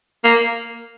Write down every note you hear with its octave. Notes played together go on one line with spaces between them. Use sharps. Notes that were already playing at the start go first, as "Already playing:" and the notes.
A#3